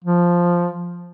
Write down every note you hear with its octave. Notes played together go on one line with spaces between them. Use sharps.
F3